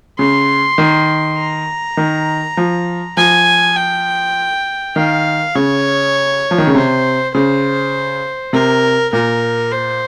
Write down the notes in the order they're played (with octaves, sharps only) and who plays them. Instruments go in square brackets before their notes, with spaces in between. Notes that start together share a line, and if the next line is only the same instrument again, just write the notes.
[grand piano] C#3 [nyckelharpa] C6
[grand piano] D#3
[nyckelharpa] A#5
[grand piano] D#3
F3
[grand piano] F3 [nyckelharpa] G#5
[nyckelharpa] G5
[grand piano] D#3 [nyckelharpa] F5
[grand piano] C#3 [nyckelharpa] C#5
[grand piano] F3
D#3
C#3
[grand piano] C3 [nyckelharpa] C5
[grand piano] C#3 [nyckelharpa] C5
[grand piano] C3 [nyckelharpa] A#4
[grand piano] A#2 [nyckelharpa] A#4
[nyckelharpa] C5